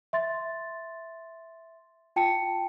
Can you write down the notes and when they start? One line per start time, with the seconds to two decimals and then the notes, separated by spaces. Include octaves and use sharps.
0.13 E5 C6 A6
2.16 F4 G5 A5 C#7